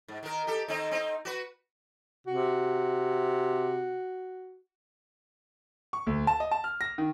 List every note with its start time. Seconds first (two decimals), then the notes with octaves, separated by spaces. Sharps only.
0.08 G#2
0.23 D#3 A#4
0.47 G4 A4
0.68 D#3 C4 D#4
0.91 C4 D#4
1.25 F#4 B4
2.27 C3 F#4
5.93 C#6
6.07 D2
6.27 A5
6.40 D#5
6.51 A5
6.64 F6
6.81 A#6
6.98 D#3